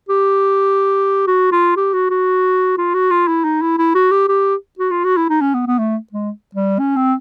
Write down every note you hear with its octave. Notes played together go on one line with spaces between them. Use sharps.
G4
F#4
F4
G4
F#4
F#4
F4
F#4
F4
E4
D#4
E4
E4
F#4
G4
G4
F#4
F4
F#4
E4
D#4
C#4
B3
B3
A3
G#3
G3
C#4
C4